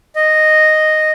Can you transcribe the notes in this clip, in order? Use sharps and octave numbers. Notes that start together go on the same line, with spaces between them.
D#5